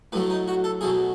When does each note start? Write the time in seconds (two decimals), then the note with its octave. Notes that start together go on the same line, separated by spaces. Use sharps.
0.12 A2 F#3 A3 B4
0.30 D#4
0.48 F#4
0.64 A4
0.81 B2 F#3 A3 G#4